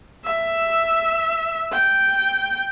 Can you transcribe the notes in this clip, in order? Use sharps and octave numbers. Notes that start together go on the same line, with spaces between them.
E5
G5